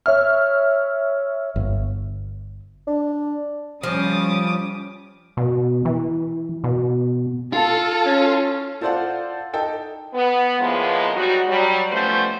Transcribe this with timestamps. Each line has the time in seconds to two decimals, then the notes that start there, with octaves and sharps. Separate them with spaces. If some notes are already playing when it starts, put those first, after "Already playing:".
0.06 C#5 E5 F6
1.56 G1
2.87 D4
3.83 C#3 F3 G3 C#4 D6 D#6
5.37 B2
5.85 E3
6.64 B2
7.53 F4 A4
8.05 C#4
8.81 F4 A4 C5 D5 F5 F#5
9.53 D#4 A4 G5
10.14 B3
10.60 A2 D#3 F3 G#3 A#3 B3
11.16 F#3 G3 D#4 F#4
11.48 F#3 G3
11.92 F3 G3 A3 B3 C#4 C5